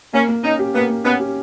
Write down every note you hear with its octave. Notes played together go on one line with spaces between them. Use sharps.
A#3 C#4
A#3
C#4 D#4
G4
A#3 B3
A#3
B3 C#4
G4